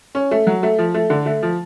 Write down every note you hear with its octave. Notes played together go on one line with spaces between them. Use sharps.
C#4
A3
F#3
A3
F3
A3
D3
A3
F3